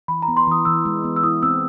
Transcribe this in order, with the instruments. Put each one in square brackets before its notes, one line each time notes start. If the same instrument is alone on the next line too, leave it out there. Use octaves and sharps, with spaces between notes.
[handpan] E3 [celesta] B5
[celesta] A#5
[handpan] B3
[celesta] C6
[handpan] E3 [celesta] D#6
[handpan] E3 [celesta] E6
[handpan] G#3
B3
[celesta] E6
[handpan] E4 [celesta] D#6
[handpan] C4 [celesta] E6